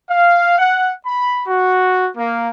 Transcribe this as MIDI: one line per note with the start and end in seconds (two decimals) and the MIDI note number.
0.10 0.57 77
0.59 0.93 78
1.06 1.43 83
1.47 2.08 66
2.17 2.49 58